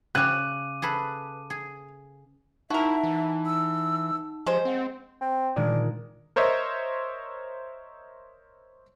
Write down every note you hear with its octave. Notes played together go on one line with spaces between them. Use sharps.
C#3 C#4 D6 F#6 D#7
G#4 A4 B4
G#4
D#4 E4 F#4 A#4 E5 F#5 A5
E3
E6
F3 G#3 G4 C5
C4 F#5
C4
A#2 D#3 G#3 D4
A#4 C5 C#5 D#5 E5